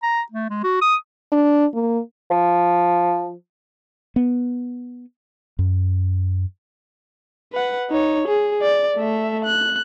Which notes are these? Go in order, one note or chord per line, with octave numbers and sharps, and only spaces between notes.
A#5
A3
G#3
F#4
D#6
D4
A#3
F3
B3
F#2
B4 F#5
D#4 C#5
G#4
D5
A3 E5
F#6